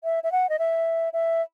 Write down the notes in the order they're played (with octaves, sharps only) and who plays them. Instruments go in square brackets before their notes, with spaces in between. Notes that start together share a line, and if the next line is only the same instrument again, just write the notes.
[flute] E5
E5
F#5
D#5
E5
E5